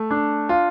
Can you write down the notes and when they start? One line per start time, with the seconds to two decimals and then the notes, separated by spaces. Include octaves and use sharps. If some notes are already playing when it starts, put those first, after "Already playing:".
Already playing: A3
0.11 D4
0.49 F4